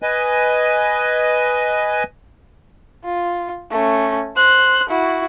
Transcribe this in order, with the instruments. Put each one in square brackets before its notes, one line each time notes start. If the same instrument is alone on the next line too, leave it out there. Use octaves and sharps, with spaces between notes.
[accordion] B4 D#5 G#5
[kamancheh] F4
A3 C#4
C5 F#6
E4 F#4